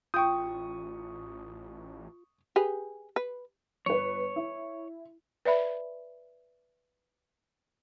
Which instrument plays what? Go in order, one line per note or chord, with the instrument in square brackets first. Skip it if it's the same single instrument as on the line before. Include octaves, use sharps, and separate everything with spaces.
[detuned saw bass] A1 [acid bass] F4 [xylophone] G5 G6 [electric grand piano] C#6 D#6
[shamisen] G4 G#4 B4
B4
[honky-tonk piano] G1 B4 [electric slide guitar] C#5
[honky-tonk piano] E4
[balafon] B4 D5 E5 B5